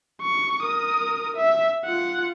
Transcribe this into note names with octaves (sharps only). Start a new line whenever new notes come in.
C#6
A#4 D#6
E5
F4 F#5